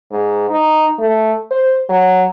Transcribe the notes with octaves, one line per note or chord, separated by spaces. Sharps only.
G#2
D#4
A3
C5
F#3